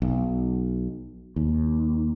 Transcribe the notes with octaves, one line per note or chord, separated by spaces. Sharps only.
B1
D#2